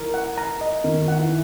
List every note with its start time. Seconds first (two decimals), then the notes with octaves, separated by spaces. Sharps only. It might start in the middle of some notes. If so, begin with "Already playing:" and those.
Already playing: E3 A#4
0.14 F#5
0.38 A#5
0.61 D#5
0.84 D#3 A#4
1.02 D#3
1.08 F#5
1.19 E3